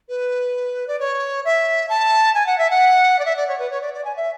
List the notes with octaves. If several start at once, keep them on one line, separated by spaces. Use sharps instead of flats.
B4
D5
C#5
E5
A5
G#5
F#5
E5
F#5
D5
E5
D5
C#5
B4
C#5
D5
D5
G#5
E5